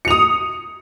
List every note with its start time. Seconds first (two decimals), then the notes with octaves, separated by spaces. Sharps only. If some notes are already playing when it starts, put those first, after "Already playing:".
0.05 C#7
0.08 F7
0.11 D#6